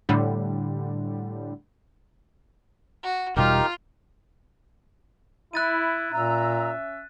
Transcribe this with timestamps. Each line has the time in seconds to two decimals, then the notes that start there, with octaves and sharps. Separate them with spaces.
0.09 A2 D3 G3
3.03 F#4
3.37 E1 B2 G3 D#4 F4 G4 A#4
5.53 E4 F#6 A6 D#7
6.12 A#2 C#4 E5 A#5 E6